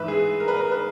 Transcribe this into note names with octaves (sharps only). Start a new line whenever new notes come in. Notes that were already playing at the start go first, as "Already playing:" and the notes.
Already playing: G#2 E3 B4 E5
G#4
A#4
B4
A#4
B4